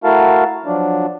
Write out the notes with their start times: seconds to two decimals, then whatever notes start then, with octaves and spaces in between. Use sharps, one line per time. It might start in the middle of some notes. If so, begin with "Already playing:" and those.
0.04 A3 E4 F#4 A#4 F5 A5
0.66 F3 F#3 D4